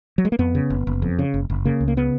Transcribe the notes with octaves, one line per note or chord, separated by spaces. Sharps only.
F#3
G#3
A#3
F2 B3
C#3
F#1
F#1
F2
C#3
F#1
F#1
C#3 A#3
C#2
A#3
C#3 B3